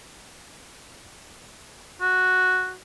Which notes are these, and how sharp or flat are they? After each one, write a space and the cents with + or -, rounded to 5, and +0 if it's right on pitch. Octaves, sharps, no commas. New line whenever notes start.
F#4 -5